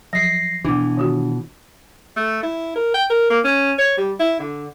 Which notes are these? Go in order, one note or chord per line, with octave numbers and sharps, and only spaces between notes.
F3 F#3 A#6 C7
B2 E3 D4 D6
D#3 F4 F#4
A3
E4
A#4
G5
A#4
A#3
C#4
C#5
G3
E4
D3